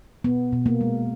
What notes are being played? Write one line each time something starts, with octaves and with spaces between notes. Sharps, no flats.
B2 B3
B2
A#3
G#3